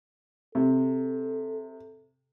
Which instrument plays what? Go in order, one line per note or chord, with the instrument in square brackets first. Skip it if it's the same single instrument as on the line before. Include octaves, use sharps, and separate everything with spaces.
[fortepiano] C3 [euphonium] A4